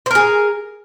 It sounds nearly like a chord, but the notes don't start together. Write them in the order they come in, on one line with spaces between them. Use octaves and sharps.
C5 A#4 G#4